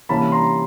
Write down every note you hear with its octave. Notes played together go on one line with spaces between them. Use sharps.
C3 E3 G3 A#3 C#4 A5 B5
A#5 C6